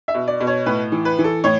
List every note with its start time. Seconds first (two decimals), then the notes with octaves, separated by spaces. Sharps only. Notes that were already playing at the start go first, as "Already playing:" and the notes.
0.08 E5
0.14 B2
0.28 D5
0.40 B2
0.47 C#5
0.66 A2 B4
0.92 E3
1.05 B4
1.19 E3
1.24 A4
1.44 A2 C#5